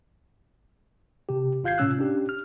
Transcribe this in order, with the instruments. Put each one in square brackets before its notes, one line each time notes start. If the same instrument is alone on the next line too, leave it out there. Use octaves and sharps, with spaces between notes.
[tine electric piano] C3 G4
G#1 F4 F5 G6 G#6 C7
A2 C3 C#4 E6 F#6
C#4 D4 G4
F6